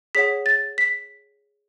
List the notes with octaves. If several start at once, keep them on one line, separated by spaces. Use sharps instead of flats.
G#4 C#5 F#5 B6
A6
B6